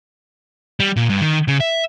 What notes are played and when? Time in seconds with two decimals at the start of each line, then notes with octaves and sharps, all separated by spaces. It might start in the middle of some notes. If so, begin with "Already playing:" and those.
0.80 G3
0.96 A#2
1.09 G2
1.21 D#3
1.48 C#3
1.60 E5